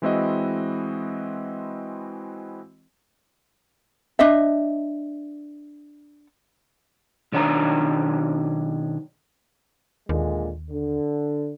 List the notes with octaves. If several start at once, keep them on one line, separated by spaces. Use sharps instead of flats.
E3 G#3 C4 E4 F#4 D#5
D4 D#5 E5
B1 D#3 D4 C#5 A#5
D#2 A#2 D3 G#3
D3